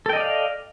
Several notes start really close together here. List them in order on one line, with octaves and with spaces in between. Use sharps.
A4 G5 D#5 D5 F5